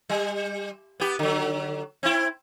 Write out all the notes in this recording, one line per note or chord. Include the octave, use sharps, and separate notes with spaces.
G3
B3 G4
D3 F#3
C4 E4